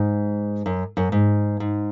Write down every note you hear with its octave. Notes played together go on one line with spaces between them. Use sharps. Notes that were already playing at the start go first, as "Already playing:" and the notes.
Already playing: G#2
F#2
F#2
G#2
G#2